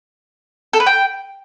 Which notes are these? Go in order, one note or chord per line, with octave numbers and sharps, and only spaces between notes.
A4
B4
G5